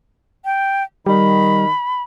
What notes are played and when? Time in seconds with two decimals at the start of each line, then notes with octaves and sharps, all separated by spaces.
0.45 G5
1.06 D#3 G3 B5